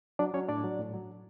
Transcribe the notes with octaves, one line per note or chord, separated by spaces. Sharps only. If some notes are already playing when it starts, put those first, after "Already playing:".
F#3 D4 D5
F#3 C#4 C#5
A2 D4 D5
F#3
A2
F#3